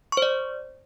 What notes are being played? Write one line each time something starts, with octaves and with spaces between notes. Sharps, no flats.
C#6
C5
D5